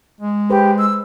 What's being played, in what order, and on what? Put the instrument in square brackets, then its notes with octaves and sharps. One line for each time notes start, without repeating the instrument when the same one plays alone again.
[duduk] G#3
[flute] G4 [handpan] G#4 B4 C5
[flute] E6